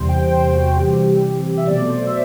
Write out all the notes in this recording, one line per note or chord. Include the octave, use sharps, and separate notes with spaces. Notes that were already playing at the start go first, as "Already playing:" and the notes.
Already playing: E2 C3 G3 C5
G5
C5
F#4
C3 E3 G3 C4 G4
E5
B2 F#3 A3 D5
C5
E5